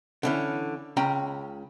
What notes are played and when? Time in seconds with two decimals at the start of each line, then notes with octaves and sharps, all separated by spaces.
0.23 D3 E3 C#4
0.97 C#2 C#4 G5 A#5 B5